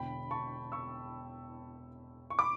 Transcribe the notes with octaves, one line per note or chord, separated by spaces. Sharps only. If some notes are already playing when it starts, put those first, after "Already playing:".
Already playing: E1 E2 D3 G5 B5
A5 C#6
C#6 E6
C#6
B5 D6